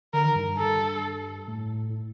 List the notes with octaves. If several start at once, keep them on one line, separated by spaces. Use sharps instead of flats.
D3 A#4
D#3
G2
G2
G2 A4
A2
A2